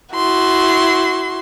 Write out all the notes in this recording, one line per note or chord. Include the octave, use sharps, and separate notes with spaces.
E4 F#4 C6